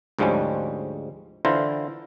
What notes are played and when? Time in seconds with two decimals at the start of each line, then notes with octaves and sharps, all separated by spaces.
0.19 D2 G#2 F3 G3 G#3 C#4
1.45 D3 E3 E4 F4 C5 A#5